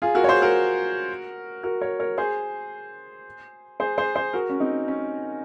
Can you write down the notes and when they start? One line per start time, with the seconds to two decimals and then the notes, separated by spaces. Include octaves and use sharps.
0.02 F4 G#4
0.15 F#4 A#4
0.24 C#5
0.29 G#4 C5
0.42 F#4 A#4
1.63 F#4 A#4
1.81 A#4 C#5
2.00 A#4 C#5
2.18 G#4 C5
3.80 G#4 C5
3.98 G#4 C5
4.15 G#4 C5
4.33 F#4 A#4
4.49 C#4
4.60 C4 D#4
4.88 C#4